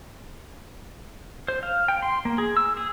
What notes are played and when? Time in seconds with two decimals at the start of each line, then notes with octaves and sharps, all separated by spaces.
1.48 C5
1.63 F5
1.88 G5
2.03 C6
2.25 A#3
2.38 G#4
2.57 E6
2.77 G#4